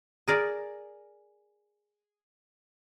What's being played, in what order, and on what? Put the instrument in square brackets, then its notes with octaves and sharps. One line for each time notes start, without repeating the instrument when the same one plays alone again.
[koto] G#4 A#4 D5